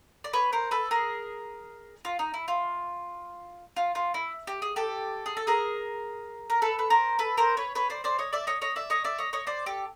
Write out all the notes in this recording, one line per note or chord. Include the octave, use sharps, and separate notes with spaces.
D5
B4 C#5
A#4 C5
A4 B4
G#4 A#4
F4
D#4
E4
F4
F4
F4
E4
G4
G#4
G4 A4
G#4
A4
G#4 A#4
A#4
A4 B4
B4
A#4 C5
A4 B4
A#4 C5
B4 C#5
B4 C#5
C5 D5
C5 D5
C#5 D#5
D5 E5
C#5 D#5
C#5 D#5
D5 E5
C#5 D#5
D5 E5
C#5 D#5
C#5 D#5
C5 D5
G4 A4